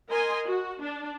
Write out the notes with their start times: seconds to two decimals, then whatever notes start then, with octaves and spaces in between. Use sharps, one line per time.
0.10 A#4 D#5 G#5 C6
0.46 F#4
0.82 D4